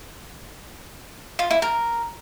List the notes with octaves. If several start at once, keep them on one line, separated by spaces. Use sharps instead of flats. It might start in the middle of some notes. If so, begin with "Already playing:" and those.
F4
E4
A#4